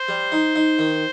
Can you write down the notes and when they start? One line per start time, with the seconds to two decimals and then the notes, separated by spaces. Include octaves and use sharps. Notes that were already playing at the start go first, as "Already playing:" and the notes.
Already playing: C5
0.08 G3
0.32 D#4
0.56 D#4
0.79 D#3